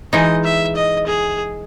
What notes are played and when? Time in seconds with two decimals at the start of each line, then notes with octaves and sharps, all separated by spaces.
0.13 E3 G#3 D#4 D#5
0.44 E5
0.76 D#5
1.06 G#4